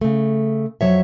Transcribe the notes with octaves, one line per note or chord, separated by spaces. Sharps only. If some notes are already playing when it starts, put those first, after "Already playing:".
C#3 A3
F2 G#2 F#3 C#5 E5